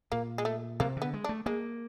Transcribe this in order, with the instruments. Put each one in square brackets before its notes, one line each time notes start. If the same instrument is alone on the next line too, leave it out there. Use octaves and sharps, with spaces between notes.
[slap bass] A#2 [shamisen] A#3
[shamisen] G#3
A3
[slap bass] C3 [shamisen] A#3
[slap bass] D3 [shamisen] B3
[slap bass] G#3
[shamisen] D4
[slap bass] A3
[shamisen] G#3 [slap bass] A#3